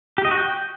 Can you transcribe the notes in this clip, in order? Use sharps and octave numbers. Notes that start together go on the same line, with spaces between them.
G4
D#5
F#4
G5